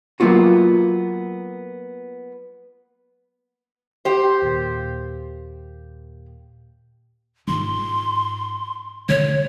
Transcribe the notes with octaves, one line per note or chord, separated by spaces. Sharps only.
F#3 A#3 B3 F4 F#4
G4 C5
D#2 A#2
G#2 F4 C6
D3 C#5